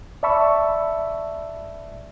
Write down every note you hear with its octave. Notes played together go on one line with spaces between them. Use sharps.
D5 E5 A5 B5 C#6 E6